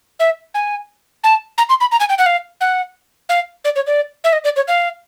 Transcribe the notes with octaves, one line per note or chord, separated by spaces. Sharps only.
E5
G#5
A5
A#5
C6
B5
A#5
G#5
G5
F#5
F5
F#5
F5
D5
C#5
D5
E5
D#5
D5
C#5
F5